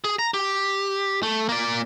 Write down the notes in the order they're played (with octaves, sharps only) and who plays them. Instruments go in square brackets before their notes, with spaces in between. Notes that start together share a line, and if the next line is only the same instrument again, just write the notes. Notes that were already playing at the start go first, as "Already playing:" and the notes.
[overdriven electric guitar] G#4
A#5
G4
A3
A#3 D5